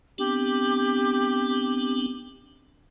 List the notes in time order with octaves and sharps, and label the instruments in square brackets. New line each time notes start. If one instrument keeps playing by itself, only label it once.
[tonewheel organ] B3 C4 D4 [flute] G4